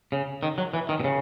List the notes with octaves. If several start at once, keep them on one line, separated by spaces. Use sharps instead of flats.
C#3
D#3
F#3
E3
D#3
B2
C#3